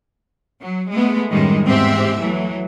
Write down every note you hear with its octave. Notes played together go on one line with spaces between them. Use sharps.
F#3
G#3 A3 B3
F#2 A2 D#3 G3 G#3
E2 G#2 C4 G4 E5
E3 F#3 A3